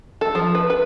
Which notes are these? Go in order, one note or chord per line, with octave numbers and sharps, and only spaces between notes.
A4
F3
B4
B4